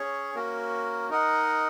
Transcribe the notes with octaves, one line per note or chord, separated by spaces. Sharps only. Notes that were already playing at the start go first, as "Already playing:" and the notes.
Already playing: C#4 G#4 C#5
A#3 C#4 F#4 A#4
D#4 A#4 D#5 F#5